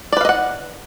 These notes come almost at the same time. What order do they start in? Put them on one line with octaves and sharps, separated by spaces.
D5 B4 F5 D#5 F#5